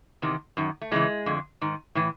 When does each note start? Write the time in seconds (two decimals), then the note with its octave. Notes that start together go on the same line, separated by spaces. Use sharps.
0.22 E2 C3 D#3
0.57 F#2 D#3
0.81 A3
0.91 E2 C#3 E3 G#3
1.26 F2 D3
1.61 G#2 D#3
1.95 A2 E3